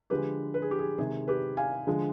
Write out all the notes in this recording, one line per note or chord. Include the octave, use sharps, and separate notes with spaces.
D3 F3 G#3 G4 B4
B4
G#4
G4
G#4
C3 D#3 G#3 G#4
G4 B4
F5 G#5
D3 F3 G#3